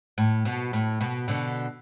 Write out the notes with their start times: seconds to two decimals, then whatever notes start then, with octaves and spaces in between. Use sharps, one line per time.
0.18 A2
0.45 B2
0.73 A2
1.01 B2
1.28 B2 D3